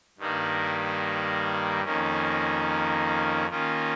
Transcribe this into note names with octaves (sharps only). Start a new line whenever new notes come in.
G2 D#3 G3 A#3
F2 D#3 A#3 C#4
D#3 A#3 C#4 F4